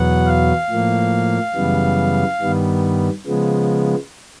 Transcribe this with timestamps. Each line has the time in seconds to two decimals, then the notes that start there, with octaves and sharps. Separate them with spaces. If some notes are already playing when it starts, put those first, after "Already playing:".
Already playing: E2 B2 F#3 B3 F#5
0.27 F5
0.69 A2 F3 A#3
1.55 F#2 C#3 E3 G3 B3
2.41 G2 D#3 G3 B3
3.26 C#3 F3 G#3 B3